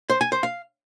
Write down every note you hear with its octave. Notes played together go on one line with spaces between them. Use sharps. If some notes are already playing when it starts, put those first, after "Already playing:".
C5
G#5
C5
F5